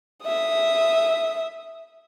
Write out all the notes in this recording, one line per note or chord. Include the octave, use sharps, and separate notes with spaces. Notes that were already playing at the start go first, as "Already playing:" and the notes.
E5 D#6